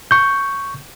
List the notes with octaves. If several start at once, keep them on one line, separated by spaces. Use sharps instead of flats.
C#6 G6